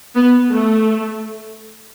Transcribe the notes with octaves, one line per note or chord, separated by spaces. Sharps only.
B3
A3